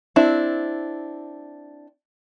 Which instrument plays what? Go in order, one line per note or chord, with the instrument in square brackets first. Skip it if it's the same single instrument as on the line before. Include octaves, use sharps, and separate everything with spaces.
[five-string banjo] C4 D4 E4